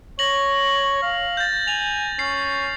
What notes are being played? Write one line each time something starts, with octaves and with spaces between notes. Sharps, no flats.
C#5 A#6 F#7
F5
G6 A6
G#5 F7
C#4 C7